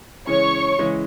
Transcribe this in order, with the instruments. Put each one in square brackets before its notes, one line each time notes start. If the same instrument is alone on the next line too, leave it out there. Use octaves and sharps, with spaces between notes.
[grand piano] C#3 E3 G#3 C#4 E4 [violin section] C#5 C#6
[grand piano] C#3 E3 G#3 C#4 E4